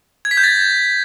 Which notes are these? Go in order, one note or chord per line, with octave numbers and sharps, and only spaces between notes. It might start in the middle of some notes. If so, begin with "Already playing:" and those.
G#6
B6
G6
A6